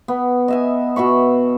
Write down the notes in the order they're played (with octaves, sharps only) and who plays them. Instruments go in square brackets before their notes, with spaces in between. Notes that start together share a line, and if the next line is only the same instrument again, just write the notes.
[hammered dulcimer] B3
D#5 E5 G#5
B2 E5 B5 C#6